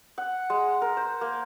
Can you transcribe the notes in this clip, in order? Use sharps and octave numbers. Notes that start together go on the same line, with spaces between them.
F#5
G#3
A#4
C5
A#3